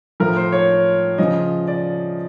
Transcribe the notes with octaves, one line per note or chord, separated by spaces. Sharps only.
A2 F3 A#4
C5
C#5
C#3 F3 D#5
D5